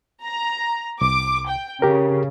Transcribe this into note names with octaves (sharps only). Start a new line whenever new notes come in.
A#5
C2 D6
G5
C#3 G4 A#4